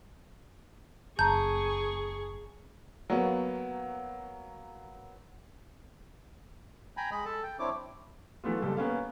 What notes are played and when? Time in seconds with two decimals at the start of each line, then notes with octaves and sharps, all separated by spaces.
1.19 F#1 G#4 A5 A#5 C#6 G6
3.10 F#3 A#3 B3
6.97 G5 G#5 A#5 B5
7.11 G#3 D#5 B5
7.25 A4 A5
7.43 G5
7.59 C4 D4 E4 C#5 D6
8.44 E3 F#3 A3 B3 F4
8.62 F#1 G3 A4
8.77 A#3 B3 C#4 F5